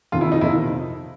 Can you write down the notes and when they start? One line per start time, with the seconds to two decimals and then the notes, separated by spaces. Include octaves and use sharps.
0.12 F2 C3 D#3 F4
0.21 E4
0.32 D#4
0.41 F2 C3 D#3 E4